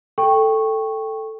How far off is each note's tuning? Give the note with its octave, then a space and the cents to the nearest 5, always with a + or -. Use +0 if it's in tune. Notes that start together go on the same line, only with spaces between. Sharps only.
A4 +0 G5 +0 C#6 -10